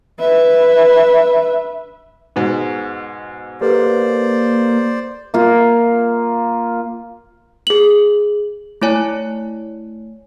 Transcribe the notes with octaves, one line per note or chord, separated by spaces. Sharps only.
B4 E5
G#2 B2
A#3 G4 A4 B4 C5 D5
A#3 F4
G#4 F#7
A3 E4 C#5 G#5